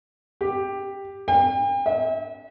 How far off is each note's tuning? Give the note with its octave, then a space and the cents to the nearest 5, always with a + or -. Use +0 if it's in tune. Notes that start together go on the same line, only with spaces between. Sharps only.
G4 +5
G5 +40
E5 -40